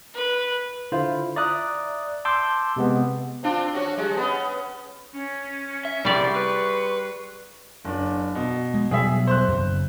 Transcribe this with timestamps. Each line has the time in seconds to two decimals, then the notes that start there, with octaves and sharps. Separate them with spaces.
0.14 B4
0.92 D3 E4 F4 C5
1.36 D5 E5 A#5 D#6 F#6
2.25 A5 C6 D6 E6 G6
2.76 C3 G#3 B3
3.43 C4 D4 F4
3.73 C#4 F#4 C#5
3.97 G3 G#3
4.17 B3 C#4
5.14 C#4
5.85 E5
6.05 C2 G3 G#4 D5 C6 C#6
6.36 B4
7.85 F#1 D4
8.35 B2
8.74 G#3
8.91 B2 F#3 G3 G#4 E5
9.27 C5 F#6
9.48 F#2 C#3